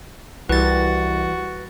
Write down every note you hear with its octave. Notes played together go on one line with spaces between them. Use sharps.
C2 E3 G3 F#4 B4 A6